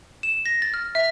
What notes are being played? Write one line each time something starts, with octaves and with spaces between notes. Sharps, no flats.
E7
A#6
A6
F6
E5